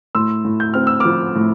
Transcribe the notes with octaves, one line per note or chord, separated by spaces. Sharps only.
A2 C6 E6
A2
G6
C4 F6
E6
F3 D6 F6
A2